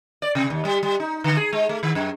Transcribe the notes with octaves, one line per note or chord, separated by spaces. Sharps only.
D5
C3
D#2
G3
G3
D#4
D3
G#4
G#3
A3
D#3
F#2